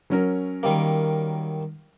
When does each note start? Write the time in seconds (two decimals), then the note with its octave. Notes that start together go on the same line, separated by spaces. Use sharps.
0.10 F#3 C#4 A#4
0.63 D#3 G3 A#3